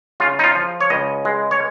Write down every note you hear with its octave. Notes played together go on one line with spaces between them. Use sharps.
C#3 F4
D#4
F4
F3
C#5
C#2 D#5
G#3
C#5